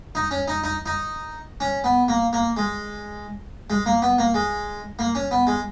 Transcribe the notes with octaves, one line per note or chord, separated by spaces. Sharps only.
D#4
C#4
D#4
D#4
D#4
C#4
B3
A#3
A#3
G#3
G#3
A#3
B3
A#3
G#3
A#3
C#4
B3
G#3